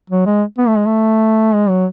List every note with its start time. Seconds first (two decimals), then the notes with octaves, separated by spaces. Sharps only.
0.10 F#3
0.26 G#3
0.58 B3
0.68 A3
0.77 G#3
0.86 A3
1.54 G#3
1.69 F#3